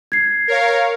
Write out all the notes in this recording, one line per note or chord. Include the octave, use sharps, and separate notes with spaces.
G#6 C7
A#4 C#5 F5